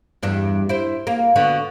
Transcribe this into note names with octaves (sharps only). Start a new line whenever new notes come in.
E2 G2 D4
E4 C5
A#3
D3 B3 F#4